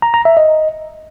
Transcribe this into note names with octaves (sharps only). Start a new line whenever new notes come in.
A#5
A#5
E5
D#5